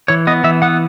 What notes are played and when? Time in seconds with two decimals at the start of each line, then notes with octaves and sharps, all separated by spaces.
0.08 E3 C#5
0.27 B3 D#5
0.44 E3 E5
0.62 B3 F#5